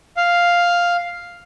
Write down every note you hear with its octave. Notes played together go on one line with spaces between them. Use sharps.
F5